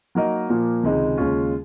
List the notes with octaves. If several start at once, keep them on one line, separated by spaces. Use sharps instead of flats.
F#3 A#3 D#4 A#4 D#5
A#2 F3 A#3
C#2 C3 D#3 G#3 D#4
D#2 C#3 G#3 C#4 F4